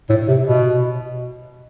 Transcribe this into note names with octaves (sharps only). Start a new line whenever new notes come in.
A2
C3
B2